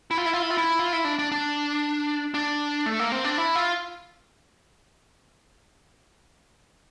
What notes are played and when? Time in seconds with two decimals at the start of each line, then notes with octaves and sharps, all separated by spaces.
0.11 E4
0.18 F4
0.26 E4
0.33 F4
0.42 E4
0.50 F4
0.57 E4
0.79 F4
0.93 E4
1.05 D4
1.19 D4
1.32 D4
2.34 D4
2.86 A3
2.99 A#3
3.12 C4
3.24 D4
3.38 E4
3.56 F4